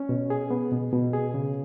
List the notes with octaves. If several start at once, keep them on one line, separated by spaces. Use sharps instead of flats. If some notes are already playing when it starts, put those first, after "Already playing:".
Already playing: C#4
B2
G#4
B3
B2
B2
G#4
C#3